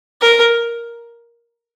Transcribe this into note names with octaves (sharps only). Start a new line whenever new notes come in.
A#4